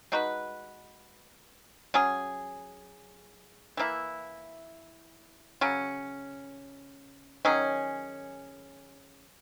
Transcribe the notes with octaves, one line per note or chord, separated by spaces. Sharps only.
G#3 D#4 F#4 B4
F#3 C#4 G#4
E3 A#3 E4
C#3 F#3 C#4
D#3 F#3 C#4 G#4